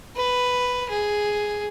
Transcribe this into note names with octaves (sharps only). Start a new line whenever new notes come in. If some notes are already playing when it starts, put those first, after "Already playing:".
B4
G#4